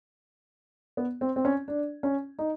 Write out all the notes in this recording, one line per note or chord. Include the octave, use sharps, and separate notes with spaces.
B3
C4
C4
C#4
D4
C#4
D#4